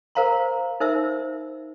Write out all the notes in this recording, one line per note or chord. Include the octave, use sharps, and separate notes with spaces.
A#4 C5 F5 A#5 C6
D#4 A#4 C5 E5 E6